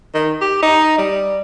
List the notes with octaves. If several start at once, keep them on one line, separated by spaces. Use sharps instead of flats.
D#3
G4
D#4
G3